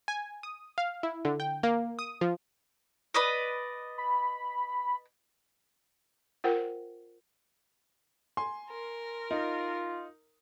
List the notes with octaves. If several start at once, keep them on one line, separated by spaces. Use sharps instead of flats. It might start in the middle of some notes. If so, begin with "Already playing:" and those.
G#5
D#6
F5
E4
D3
G5
A#3
D#6
F3
B4 D5 D#5
B5
F4 A#4 C5 F#5 G5
G#5 C6
A#4
D#4 F4